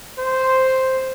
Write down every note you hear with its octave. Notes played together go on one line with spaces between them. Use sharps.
C5